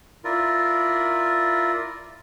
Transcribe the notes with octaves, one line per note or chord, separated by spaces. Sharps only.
E4 F4 A#4 D5